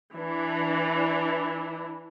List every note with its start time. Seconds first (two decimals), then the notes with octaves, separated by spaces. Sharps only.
0.14 E3 D4